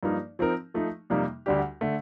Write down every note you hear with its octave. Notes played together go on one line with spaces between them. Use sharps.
G2 F3 A#3 D#4
F3 C4 D#4 A#4
F3 A3 D#4
F2 C3 G3 A#3 D#4
D2 D3 G3 D4 G4
D3 A3